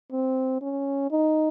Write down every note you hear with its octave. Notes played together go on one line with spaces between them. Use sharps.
C4
C#4
D#4